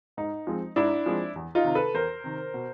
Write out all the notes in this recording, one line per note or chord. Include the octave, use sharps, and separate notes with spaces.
G#2 D#4
F3 G#3 C4
G#2 D4 E4
F3 G#3 C4
E2
D#4 F4
C3 D#3
A4 B4
E2 A#4 C5
C3 D#3
B2